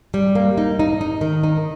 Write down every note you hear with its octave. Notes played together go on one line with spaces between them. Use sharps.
G3
A#3
D#4
D#4
D#4
D#3
D#4